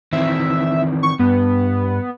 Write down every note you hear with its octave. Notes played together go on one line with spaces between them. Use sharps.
D#3 E3 C4 E5
C#6
G2 B3